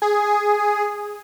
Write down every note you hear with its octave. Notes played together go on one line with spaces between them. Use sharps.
G#4